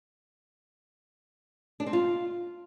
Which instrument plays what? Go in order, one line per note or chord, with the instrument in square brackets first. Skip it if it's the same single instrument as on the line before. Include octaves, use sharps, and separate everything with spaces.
[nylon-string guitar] D4
C4
F4